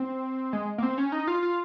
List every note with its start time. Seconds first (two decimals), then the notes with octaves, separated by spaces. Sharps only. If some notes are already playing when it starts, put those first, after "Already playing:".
Already playing: C4
0.53 G#3
0.78 A#3
0.83 C4
0.98 C#4
1.12 D#4
1.28 F4
1.43 F4